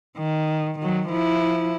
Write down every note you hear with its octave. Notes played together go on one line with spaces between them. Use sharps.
D#3
D#3 F#3
F3 E4